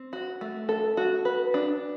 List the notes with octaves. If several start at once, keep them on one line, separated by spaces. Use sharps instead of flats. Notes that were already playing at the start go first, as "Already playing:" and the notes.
Already playing: C4
F#4
A3
A4
F#4
B4
D4